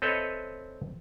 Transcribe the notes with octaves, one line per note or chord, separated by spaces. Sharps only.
C4 A4 B4 C#5 D#5 E5